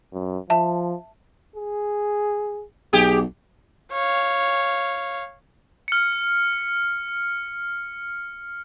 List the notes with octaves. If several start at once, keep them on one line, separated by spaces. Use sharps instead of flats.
F#2
F3 E5 A5
G#4
B1 G4 G#4
C#5 F5
F6 C#7